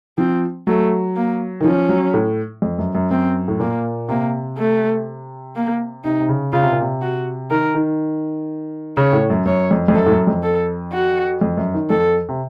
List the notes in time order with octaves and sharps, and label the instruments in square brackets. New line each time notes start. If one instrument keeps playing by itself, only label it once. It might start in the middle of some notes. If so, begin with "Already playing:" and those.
[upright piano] F3 [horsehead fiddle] C4
[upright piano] F#3 [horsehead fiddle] A3
[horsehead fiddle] A#3
[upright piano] D#3
[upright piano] F3 [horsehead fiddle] C#4
[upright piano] F#3
A2
F2
F#2
F#2
[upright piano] F#2 [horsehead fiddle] C4
[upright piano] A2
[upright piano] A#2 [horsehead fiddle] A#3
[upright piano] C3 [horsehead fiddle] A#3
[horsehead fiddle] A3
A#3
[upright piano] C3 [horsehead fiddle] D#4
[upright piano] C3
C#3
[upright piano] C#3 [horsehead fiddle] F4
[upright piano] C3
A#2
C3
[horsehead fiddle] F#4
[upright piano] D#3 [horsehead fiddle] A#4
[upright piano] D#3
[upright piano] C#3 [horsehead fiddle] C#5
[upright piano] A2
F#2
[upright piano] F#2 [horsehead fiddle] C#5
[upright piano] F2
F2
[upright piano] F#2 [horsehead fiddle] A4
[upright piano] A2
F#2
F2
[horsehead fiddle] A4
F#4
[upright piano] F2
F#2
D#3
[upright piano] F2 [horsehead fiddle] A4
[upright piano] C3